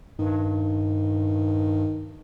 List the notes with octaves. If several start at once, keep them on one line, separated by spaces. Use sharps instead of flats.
G2 D#3